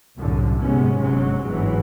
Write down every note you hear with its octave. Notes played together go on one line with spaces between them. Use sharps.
C2 F#2 A2 D3
G#1 F#2 C3 G#3 B3 C#4
G1 G#2 C3 F#3 G#3
G1 G#2 E3 F#3